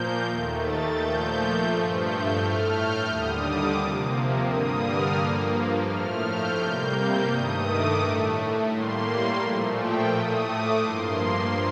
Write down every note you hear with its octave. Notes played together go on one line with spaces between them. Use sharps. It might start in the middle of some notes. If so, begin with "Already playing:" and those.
Already playing: A#2 F3 A#3 G6
D#2 D#3 A3
A6
A#2 F3 A3 G6
G2 F3 A3
G6
A2 A3 F6
G6
D#2 D3 G3 D#6
D6
C3 F3 A#3
G2 D3 G3 A#3 D#6
F6
G2 F3 A#3
A2 F3 A3 F6
G6
C3 G3 A#3 G6
G2 D#3 A3 D#6
D6
A2 A3
A2 G3 A#3 C6
A#2 F3 A3
G5
A2 A3 D#6
D6
G2 F3 A#3 C6